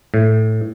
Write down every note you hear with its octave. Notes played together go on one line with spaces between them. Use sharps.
A2